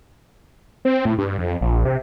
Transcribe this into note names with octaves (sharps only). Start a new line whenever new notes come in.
C4
A2
G2
F2
A#1
C3